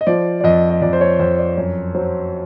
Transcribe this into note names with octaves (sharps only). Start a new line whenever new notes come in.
D#5
F3 D5
D5
F2 D#5
D#5
F2 D5
C5
C#5
F2 C5
D5
F#2 C#5
F#3 C5